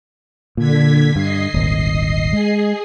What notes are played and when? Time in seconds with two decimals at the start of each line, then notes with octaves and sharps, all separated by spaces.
0.57 A#2 D3 G#6 B6
1.16 G2 D#5 C7
1.54 D#1 G#1
2.33 G#3 G#4